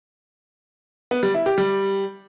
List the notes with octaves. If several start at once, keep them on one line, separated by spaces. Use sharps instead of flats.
B3
G3
E4
G4
G3